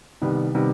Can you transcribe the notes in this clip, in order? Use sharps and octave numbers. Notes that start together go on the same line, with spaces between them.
C2 C3 D#3 G3 B3
C3 D#3 G3 B3